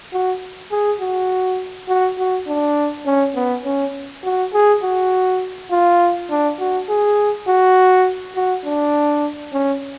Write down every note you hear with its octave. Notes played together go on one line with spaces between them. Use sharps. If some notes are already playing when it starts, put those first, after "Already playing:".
F#4
G#4
F#4
F#4
F#4
D4
C#4
B3
C#4
F#4
G#4
F#4
F4
D4
F#4
G#4
F#4
F#4
D4
C#4